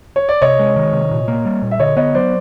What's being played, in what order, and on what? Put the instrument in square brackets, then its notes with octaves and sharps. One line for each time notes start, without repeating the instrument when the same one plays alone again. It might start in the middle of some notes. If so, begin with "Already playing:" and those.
[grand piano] C#5
D5
[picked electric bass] C3 [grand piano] C#5 D#5
[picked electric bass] G#3
D#3
C3
A#2
A#3
G3
A#2
[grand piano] E5
[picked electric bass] D3 [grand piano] C#5 D#5
[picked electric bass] B3 [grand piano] C#5 D#5
[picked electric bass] F#3 [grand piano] C5 D5